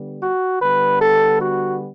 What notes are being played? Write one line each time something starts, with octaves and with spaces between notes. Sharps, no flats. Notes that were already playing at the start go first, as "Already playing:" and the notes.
Already playing: D3 G3 B3
F#4
D3 G3 B3 B4
A4
F#4